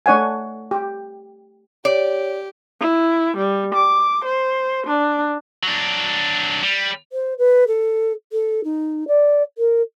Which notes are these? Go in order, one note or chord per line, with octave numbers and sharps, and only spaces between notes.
A3 D4 C#5 F#5 G#5
G4
G4 C#5 D5
E4
G3
D6
C5
D4
F#3 D4
G3
C5
B4
A4
A4
D#4
D5
A#4